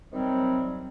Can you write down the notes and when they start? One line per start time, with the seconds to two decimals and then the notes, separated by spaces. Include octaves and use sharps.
0.12 C3 D#3 F#3 G3 C4